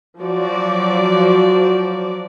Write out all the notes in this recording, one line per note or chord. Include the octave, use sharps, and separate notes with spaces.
F3 F#3 F#4 D5